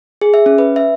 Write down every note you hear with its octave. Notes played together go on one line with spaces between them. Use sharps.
G#4
E5
C#4
B4
E5